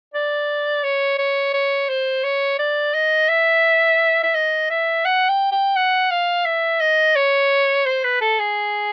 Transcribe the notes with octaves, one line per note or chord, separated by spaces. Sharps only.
D5
C#5
C#5
C#5
C5
C#5
D5
D#5
E5
E5
D#5
E5
F#5
G5
G5
F#5
F5
E5
D#5
C#5
C5
B4
A4
G#4